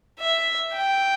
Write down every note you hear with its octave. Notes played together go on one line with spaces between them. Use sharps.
E5
G5